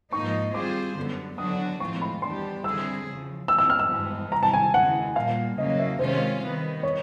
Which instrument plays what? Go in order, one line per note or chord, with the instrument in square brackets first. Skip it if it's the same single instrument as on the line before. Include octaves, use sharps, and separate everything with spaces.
[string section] G#2 F3 A#3 D#4 [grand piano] C#6
[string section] G3 C4 F4 G#4 C5 [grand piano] D6
[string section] F#2 D3 G3 B3
[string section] D3 F#3 B3 D4 F#4 [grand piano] D#6
[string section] A2 F3 G#3 C4 F4 [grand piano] C#6
[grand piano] B5
[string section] E3 G3 B3 D4 G4 [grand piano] C6
[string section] D3 G3 C4 E4 G#4 [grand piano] E6
[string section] E2 C#3 F3
[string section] A#2 G3 C4 [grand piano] E6
[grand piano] E6
F6
E6
[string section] G2 E3 G#3 B3
[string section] C3 E3 G3 [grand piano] A#5
[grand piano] A5
G#5
[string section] C#3 E3 G#3 [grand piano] F#5
[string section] A#2 G3 A#3 [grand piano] F5
[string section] C#3 F#3 A#3 [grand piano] D#5
[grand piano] E5
[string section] C3 D#3 G#3 C#4 F4 [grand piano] C5
[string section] D#3 G3 B3
[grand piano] C#5